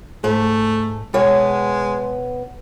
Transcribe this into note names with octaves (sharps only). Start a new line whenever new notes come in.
G#2 A3
B2 G#3 B3 C#5